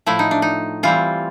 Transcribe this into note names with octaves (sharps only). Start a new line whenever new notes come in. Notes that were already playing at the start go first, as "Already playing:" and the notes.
A2 F3 A3 E4
D#4
D4
D#4
E3 G3 C4 F4